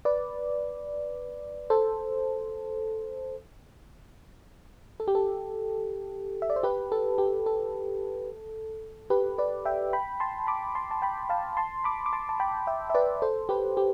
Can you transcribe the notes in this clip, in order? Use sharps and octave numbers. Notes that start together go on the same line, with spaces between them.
B4 D5
A4 C5
A4
G4
A4
E5
D5
C5
G4 B4
A4
G4
A4
G4 B4
B4 D5
E5 G5
G5 B5
A5 C6
B5 D6
A5 C6
A5
G5 B5
F5 A5
A5 C6
B5 D6
D6
A5 C6
A5
G5 B5
E5 G5
E5
B4 D5
A4 C5
G4 B4
G4